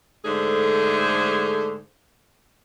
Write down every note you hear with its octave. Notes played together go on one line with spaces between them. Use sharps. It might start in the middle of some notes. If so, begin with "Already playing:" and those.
G#2 D3 A3 G#4 C5